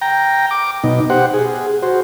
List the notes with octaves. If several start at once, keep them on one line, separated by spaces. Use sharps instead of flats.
G5 A#5
D6
B2 D#4
G4 C5 F#5
G#4
F#4 C5